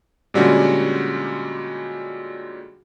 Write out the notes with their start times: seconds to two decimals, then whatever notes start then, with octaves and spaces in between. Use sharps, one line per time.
0.34 A#2 D3 G3 G#3 C#4 F#4